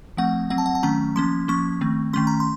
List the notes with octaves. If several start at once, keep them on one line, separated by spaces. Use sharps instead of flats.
F3 A3 C4 F#5
F#3 C4 F#5
A5
F#5
A5
D#3 F#3 A3 C#4 A#5
F3 A#3 C#4 C6
F3 A#3 C#4 C#6
D#3 A3 C4
D#3 A3 C#4 C6
A#5
C6